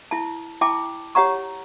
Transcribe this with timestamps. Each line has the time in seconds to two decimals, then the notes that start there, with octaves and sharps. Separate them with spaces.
0.11 E4 A5
0.61 E4 G5 A5 D6
1.15 G4 C#5 F#5 A#5 C#6